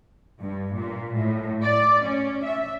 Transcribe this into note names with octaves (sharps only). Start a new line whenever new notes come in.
G2
A#2
A2
D5
C#4
E5